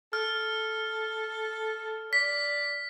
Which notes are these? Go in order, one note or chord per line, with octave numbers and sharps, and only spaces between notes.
A4 F6
D5 B6